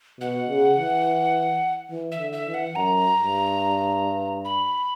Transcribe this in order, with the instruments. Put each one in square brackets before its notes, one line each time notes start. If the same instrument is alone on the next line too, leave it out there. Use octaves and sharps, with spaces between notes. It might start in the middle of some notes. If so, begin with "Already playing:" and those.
[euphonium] B2 [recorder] F#5
[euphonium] C#3
E3
E3
[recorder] E5
[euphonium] D3
[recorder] E5
[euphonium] E3
[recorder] F#5
[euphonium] F#2 [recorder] A#5
[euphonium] G2
[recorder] B5